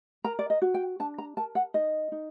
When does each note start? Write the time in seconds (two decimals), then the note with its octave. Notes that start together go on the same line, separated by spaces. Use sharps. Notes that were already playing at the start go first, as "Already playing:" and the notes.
0.24 A#4 A#5
0.39 D5
0.50 D#5
0.62 F#4
0.74 G5
1.00 D4 A5
1.18 A#5
1.37 A#4 A5
1.55 F#5
1.74 D#4 D#5
2.12 D#4